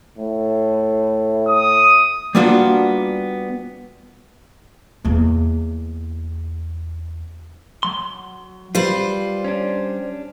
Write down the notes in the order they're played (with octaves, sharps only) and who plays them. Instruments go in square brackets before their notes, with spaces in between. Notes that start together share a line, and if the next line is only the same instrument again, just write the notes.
[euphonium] A2
[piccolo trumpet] D#6
[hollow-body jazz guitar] G3 A#3 B3 D4 F4 F#4
[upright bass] E2 A#3
[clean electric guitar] F#3 C6
[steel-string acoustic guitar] G3 C5 [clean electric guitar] F4 B4
[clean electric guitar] C#4 D4